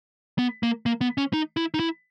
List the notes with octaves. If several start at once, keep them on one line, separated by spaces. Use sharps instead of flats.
B3
A#3
A#3
B3
C#4
D#4
E4
D#4
E4